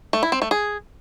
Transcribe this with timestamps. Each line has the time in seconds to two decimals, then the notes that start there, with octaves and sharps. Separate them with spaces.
0.13 A3
0.23 E4
0.32 C4
0.42 A3
0.51 G#4